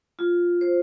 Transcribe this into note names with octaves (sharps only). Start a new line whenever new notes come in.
F4
C5